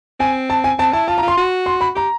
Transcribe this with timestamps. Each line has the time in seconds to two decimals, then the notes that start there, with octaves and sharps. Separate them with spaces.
0.20 C4 G#5
0.50 A5
0.64 G#5
0.78 C4 A5
0.93 E4 A5
1.08 F4 A5
1.18 A#5
1.23 F4
1.28 C6
1.38 F#4
1.66 C6
1.81 B5
1.95 G4 A#5